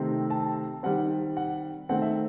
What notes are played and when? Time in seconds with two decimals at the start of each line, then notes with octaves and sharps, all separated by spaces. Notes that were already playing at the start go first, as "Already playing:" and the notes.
Already playing: C3 D#3 A3 C4
0.30 A5
0.83 D#3 G3 C4 F#5
1.37 F#5
1.89 D#3 A3 C4 F#5
2.02 E5